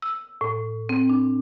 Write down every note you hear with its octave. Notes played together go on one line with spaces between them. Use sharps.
E6
A2
C4
D4